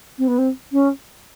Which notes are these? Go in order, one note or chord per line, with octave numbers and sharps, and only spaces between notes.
C4
B3
C4
C#4